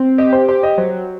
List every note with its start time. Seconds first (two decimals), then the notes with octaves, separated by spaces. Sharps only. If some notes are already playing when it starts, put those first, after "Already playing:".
Already playing: C4
0.18 G4 D#5
0.33 C5
0.48 G4 C5
0.63 D#5
0.78 F#3 C5